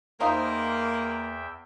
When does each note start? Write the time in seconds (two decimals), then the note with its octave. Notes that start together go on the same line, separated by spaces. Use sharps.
0.20 E2 A#3 C4 D#4 F4 E5 G5